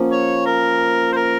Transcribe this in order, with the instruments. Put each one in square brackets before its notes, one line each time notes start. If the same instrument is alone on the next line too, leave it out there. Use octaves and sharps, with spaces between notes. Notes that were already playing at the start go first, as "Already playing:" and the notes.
Already playing: [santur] F3 A#3 C#4
[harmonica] C#5
A#4
C5
A#4